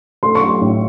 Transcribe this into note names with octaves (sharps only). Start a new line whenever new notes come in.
A3 C6
C#6
A3
C6
A2